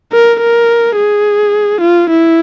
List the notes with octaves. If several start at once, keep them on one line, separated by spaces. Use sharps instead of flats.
A#4
A#4
G#4
F4
E4